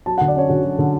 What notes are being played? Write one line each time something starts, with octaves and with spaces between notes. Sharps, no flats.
F#3 A5
F#5
D3
D5
C#4 C#5
D3 F#4
F#3
D3